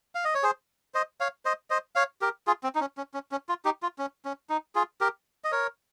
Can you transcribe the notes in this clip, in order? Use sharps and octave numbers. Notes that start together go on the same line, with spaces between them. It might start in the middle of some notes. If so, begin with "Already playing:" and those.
F5
D#5
C#5
G#4 C5
C5 D#5
C#5 F5
C5 D#5
C5 D#5
C#5 F5
G4 A#4
F4 G#4
C4
D#4
C#4
C#4
C#4
C#4
F4
D#4 G4
F4
C#4
C#4
D#4
F4 G#4
G4 A#4
D#5
A#4 C#5